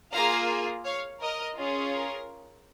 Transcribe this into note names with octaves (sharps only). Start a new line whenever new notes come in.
A#3 F4 G#4 F5 A#5
C#5 F5
A#4 D#5
C#4 F4 G#4
A#4